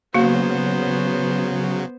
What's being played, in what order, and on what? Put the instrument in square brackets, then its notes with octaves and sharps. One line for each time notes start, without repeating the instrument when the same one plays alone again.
[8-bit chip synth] C#3 F#3 [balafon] A#3 F#4 [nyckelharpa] B3 C5